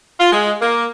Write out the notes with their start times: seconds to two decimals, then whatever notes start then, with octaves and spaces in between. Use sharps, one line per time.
0.20 F4
0.32 G#3
0.61 A#3